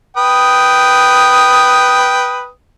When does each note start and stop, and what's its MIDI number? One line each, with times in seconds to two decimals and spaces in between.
0.17 2.48 71
0.17 2.48 79
0.17 2.48 87